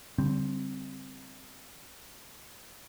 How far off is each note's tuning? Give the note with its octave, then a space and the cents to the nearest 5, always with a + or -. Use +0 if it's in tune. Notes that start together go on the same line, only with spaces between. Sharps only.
D3 -40 G3 +0 C4 +0